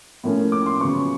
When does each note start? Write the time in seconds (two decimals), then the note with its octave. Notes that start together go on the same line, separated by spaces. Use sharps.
0.24 A2 F3 A#3 C#4
0.52 D6
0.66 C6
0.81 C#3 F#3 B3 C#6